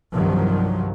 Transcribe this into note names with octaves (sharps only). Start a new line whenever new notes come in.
C2 G2 D#3 F3 F#3